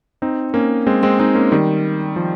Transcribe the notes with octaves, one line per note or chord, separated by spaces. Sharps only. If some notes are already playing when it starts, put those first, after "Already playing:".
C4 D#4
A#3 C#4
G#3 C4
G#3 C4
C4 D#4
A#3 C#4
D#3 G3
F3